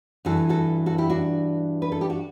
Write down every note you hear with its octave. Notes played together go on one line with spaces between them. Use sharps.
G2 E3 F#4 A4
F#4 A4
F#4 A4
E4 G4
D4 F#4
B4
A4
G4
F#4